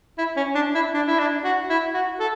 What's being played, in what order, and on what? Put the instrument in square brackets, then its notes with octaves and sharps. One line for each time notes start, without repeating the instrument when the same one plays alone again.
[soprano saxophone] E4
C#4
D4
E4
D4
E4
D4
F#4
E4
F#4
A4